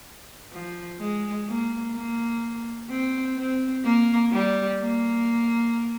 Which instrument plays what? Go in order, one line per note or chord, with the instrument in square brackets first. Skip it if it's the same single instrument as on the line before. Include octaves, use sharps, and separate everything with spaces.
[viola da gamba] F3
G#3
A#3
A#3
C4
C4
A#3
G3
A#3